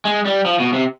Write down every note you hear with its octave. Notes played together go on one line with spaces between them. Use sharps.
G#3
G3
F3
B2
C3